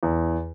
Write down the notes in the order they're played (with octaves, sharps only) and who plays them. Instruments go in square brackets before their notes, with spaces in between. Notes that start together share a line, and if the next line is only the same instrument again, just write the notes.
[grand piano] E2